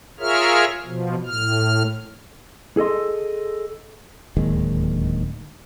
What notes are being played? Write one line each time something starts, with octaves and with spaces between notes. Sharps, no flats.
F4 G#4 A#4 C#5 E5 F6
B2 F3
A2 F6
G#4 A4 D#5 C6
D1 D#2 D#3 G#3